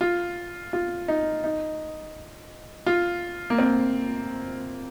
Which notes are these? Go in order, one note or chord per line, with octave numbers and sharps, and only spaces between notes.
F4
F4
D#4
D#4
F4
A#3
C4